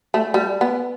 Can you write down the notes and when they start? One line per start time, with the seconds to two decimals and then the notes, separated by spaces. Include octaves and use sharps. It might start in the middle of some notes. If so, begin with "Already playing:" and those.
0.14 A3
0.34 G3
0.61 B3